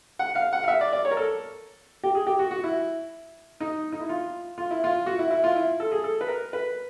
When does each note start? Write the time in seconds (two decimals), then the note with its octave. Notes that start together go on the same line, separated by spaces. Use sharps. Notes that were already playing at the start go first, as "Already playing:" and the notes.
0.19 F#5
0.35 F5
0.53 F#5
0.64 F5
0.68 E5
0.81 D5
0.93 D5
1.05 C#5
1.11 A#4
1.17 A4
2.03 G4
2.15 G#4
2.27 G4
2.39 F#4
2.51 F#4
2.64 E4
3.60 D#4
3.92 D#4
4.00 E4
4.09 F4
4.58 F4
4.71 E4
4.84 F4
5.06 F#4
5.19 E4
5.31 E4
5.44 F4
5.56 E4
5.80 A4
5.92 G#4
6.04 A4
6.21 B4
6.28 A#4
6.53 B4